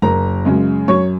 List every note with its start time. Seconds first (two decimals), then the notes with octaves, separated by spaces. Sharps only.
0.02 F#1 A#4 A#5
0.45 F#2 C#3 G#3
0.88 F#2 C#5 C#6